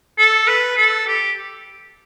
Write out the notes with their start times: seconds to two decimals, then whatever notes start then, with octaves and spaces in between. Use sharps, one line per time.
0.18 A4
0.48 B4
0.77 A4
1.07 G4